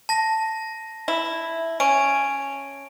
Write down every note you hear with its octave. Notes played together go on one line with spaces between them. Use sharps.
A5 A#6
E4
C#4 D7